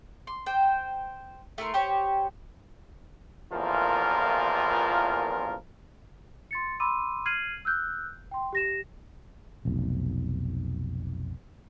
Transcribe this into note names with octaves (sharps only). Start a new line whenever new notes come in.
C6
C5 G5
A3 E4 A#4 C6
G4 C5 C#5
A1 E2 A#2 F3 F4 A#4
C6 A6 C#7
B5 C6 D6 E6 D#7
F6 G#6 C7 D#7 F#7
E6 F#6 G6
G5 C6
G4 A#6 E7
F1 B1